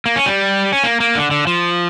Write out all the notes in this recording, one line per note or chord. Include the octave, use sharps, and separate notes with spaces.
A#3
C#4
G3
C#4
A#3
A#3
D3
D3
F3